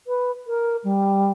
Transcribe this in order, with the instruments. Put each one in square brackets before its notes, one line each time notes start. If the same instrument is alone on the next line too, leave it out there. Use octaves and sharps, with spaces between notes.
[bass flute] B4
A#4
G3